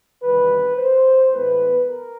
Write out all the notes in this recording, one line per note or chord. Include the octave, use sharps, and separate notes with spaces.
E2 C3 D#3 G3 B4
C5
A2 E3 G#3 B3 B4
A#4